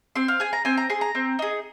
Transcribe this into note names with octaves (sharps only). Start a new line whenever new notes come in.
C4 C6
F5
G#4 G#5
A#5
C4 G#5
A#5
G#4 C6
A#5
C4
D#4 G#4